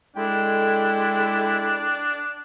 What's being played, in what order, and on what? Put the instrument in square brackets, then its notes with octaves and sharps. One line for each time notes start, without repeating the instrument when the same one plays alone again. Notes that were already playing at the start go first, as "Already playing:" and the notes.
[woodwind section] G#3 E4 [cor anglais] D4 [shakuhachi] A4 [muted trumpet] G5